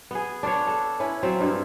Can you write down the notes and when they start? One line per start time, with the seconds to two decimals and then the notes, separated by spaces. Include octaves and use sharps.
0.11 B3 G#4
0.43 D4 F4 B4 C#5
0.67 A4
1.00 C#4 E4 B4
1.23 F#3 C4 F4 E5
1.41 G2 E4